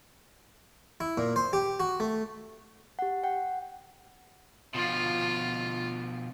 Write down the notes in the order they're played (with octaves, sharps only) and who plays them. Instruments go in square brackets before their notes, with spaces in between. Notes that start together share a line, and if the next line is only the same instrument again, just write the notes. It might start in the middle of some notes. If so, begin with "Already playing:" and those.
[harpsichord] E4
A#2
C5
G4
F#4
A3
[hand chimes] G4 F#5
F#5 G5
[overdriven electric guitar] B2 F3 [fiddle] F4